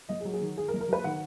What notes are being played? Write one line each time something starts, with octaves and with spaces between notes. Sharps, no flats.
F#1 D#5
G#4
F#3
G#4
D#3
D#3 G#4
A#4
F#1
A#4
F#3 B4
D#3 F#5